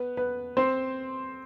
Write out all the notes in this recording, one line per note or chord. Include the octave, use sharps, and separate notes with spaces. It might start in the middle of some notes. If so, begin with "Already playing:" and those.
Already playing: B3 B4
B3 B4
C4 C5